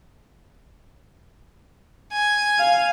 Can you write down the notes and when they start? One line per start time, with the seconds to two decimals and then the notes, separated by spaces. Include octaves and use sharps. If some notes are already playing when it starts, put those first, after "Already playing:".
2.12 G#5
2.59 F5